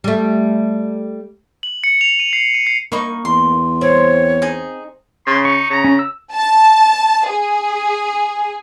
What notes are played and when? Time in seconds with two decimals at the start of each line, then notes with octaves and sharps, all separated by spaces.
0.04 G3 A3
1.63 F#7
1.84 C#7
2.01 F7
2.20 D#7
2.33 C7
2.54 D#7
2.67 C7
2.92 A#3 D#4 B5 C#6
3.25 E2 C6
3.81 C4 C#5
4.42 D#4 G#4
5.27 C#3 C6
5.45 D#4 C#6
5.70 C#3 A#5
5.84 C#4
5.99 E6
6.33 A5
7.29 G#4